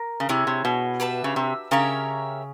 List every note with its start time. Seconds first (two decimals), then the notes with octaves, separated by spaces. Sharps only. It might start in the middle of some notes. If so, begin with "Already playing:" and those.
Already playing: A#4
0.20 C#3
0.29 C3 E4 G#4 C#5
0.47 C3
0.65 B2
1.00 G4 B4 E5 A5
1.24 C#3
1.36 C3
1.71 C#3 G4 A#4 C#5 E5